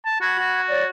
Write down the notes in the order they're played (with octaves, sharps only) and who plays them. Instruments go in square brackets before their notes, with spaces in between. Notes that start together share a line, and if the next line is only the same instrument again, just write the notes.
[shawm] A5
[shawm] F#4 [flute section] F#5 B5 G#6
[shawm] F#4
[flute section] C#5 D5